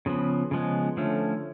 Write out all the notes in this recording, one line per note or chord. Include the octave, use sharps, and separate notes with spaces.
C#3 F3 B3
C#3 F3 G#3 B3
D3 F3 A3 C#4